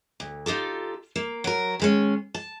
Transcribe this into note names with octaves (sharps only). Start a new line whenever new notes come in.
D2
D#4 F4 G4 A4
A#3
F#3 A#4
D#3 G#3 C#4
A5